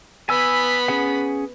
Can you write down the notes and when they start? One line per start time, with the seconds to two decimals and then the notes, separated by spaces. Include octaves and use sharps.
0.29 B3 G#5 B5 E6
0.88 C#4 G#4 F#5